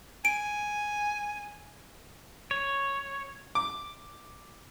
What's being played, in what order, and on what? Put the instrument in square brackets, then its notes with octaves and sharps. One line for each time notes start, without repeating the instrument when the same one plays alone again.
[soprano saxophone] G#5 [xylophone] D7
[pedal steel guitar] C#5
[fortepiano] D6